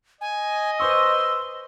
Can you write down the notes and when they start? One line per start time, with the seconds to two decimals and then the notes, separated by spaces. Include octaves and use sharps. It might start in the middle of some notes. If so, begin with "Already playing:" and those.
0.21 D#5 G#5
0.80 B4 C5 C6 C#6 E6